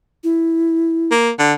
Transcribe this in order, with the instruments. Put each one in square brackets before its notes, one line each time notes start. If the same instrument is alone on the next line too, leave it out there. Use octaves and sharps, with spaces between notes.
[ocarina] E4
[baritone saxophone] A#3
D3